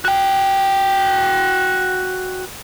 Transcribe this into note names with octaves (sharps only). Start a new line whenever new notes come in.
F#4 G5